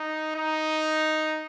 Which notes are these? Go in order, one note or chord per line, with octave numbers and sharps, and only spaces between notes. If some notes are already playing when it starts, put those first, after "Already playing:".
Already playing: D#4
D#4